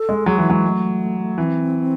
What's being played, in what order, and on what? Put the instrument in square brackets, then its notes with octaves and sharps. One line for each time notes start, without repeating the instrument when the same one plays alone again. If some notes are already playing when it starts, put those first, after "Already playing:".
Already playing: [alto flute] A4
[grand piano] G#3
[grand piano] F#3 [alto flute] G#4
[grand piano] E3 [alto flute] E4
[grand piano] F#3 [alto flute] G#3
[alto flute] A3
[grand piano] E3 [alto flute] C4